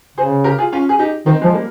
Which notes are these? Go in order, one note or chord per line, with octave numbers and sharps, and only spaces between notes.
C#3 G#4 C5
G4 A#4
F4 G#4
C#4 F4
G#4
D#4 G4
D#3 C4 D#4
F3 G#3
G3 A#3